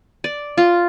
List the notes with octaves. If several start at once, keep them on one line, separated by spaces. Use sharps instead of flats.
D5
F4